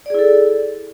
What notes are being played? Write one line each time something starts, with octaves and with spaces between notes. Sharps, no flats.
E4 G#4 A4 D5